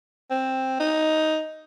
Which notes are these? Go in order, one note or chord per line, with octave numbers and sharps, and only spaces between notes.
C4
D#4